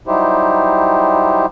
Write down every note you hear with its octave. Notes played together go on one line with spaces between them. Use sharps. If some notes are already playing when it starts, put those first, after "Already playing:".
F#3 G3 D#4 E4 G4 C5